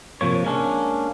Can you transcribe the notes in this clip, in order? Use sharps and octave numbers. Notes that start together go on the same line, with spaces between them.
C3 F3 A#3 C#5
G#3 A#3 C#4 D4